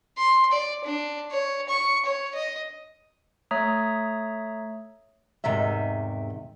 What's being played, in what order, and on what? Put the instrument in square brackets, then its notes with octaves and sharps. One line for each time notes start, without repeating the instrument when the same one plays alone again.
[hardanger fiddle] C6
D5
D4
C#5
C#6
C#5
D#5
[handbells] A3 C#5 E5 A#5 D#6
[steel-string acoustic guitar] E2 G#2 C3 D#3 E5